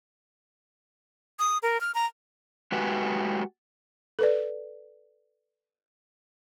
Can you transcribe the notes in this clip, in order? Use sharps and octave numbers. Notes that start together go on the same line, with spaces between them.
D#6
A#4
F6
A#5
G#3 A3 F#4 G4 B4 G#5
A4 B4 D5